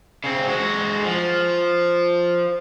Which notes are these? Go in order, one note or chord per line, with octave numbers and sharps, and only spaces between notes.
C#3 C4
G#3 F#4
F3